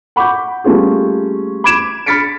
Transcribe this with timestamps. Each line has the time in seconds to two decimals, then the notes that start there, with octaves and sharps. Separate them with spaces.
0.16 F#5 B5 C#6 D6 G6
0.64 G3 A3 A#3 C#4 F4 G#4
1.64 B5 D6 G#6 D7 E7
2.06 B5 F6 A6 B6 C#7 D7